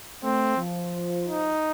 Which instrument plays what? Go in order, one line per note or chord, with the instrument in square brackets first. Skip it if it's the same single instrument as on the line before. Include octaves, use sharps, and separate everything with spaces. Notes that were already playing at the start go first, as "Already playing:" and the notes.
[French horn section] A3 [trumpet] C4
[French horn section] F3
[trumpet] D#4